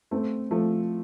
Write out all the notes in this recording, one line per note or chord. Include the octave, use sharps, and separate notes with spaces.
A3 C4
F3 A3